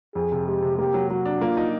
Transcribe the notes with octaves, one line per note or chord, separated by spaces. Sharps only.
F2 G#4
C3
G#3 G4
C3
A#3 G4
F#3
F#3 F#4
D4
A#3 F4
D#4